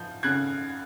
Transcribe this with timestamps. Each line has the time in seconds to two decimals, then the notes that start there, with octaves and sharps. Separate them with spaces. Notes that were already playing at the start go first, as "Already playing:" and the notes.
Already playing: F3 G6
0.23 C#3 F#6 G#6